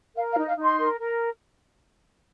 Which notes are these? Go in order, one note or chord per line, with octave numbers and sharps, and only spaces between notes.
A#4 F5
F5
D#4
F5
D#4
C6
A#4
A#4